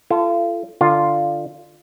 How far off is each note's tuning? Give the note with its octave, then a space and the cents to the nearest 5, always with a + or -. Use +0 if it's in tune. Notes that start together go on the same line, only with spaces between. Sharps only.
F4 -35 A4 +0
D3 +25 F4 +0